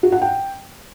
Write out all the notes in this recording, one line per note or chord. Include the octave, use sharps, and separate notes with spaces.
F#4
F#5
G5